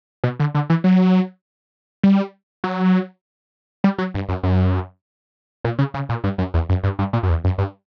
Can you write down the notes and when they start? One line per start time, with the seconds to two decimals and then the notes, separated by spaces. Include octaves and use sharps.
0.24 B2
0.40 D3
0.55 D3
0.70 E3
0.84 F#3
2.03 G3
2.64 F#3
3.84 G3
3.98 F#3
4.14 G2
4.29 F#2
4.43 F#2
5.64 A#2
5.79 C#3
5.94 C#3
6.09 A#2
6.24 G2
6.38 F#2
6.54 E2
6.69 F#2
6.83 G2
6.99 G2
7.13 A#2
7.23 F#2
7.29 E2
7.44 F#2
7.58 G2